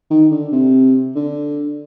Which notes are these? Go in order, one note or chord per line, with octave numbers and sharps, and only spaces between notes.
D#3
D3
C3
D3